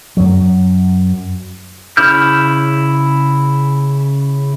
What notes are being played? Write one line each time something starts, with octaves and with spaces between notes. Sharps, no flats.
F#2 F#3
C#3 E4 D6 F6 G6